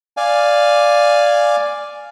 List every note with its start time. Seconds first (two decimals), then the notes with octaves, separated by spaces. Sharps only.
0.17 D5 F5 G#5